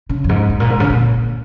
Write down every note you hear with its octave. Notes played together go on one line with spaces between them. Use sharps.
C#3
F2
G#2
G#2
A#2
G#2
C#3
A#2